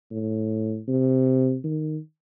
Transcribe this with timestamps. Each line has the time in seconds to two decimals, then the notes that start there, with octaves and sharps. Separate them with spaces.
0.11 A2
0.88 C3
1.64 D#3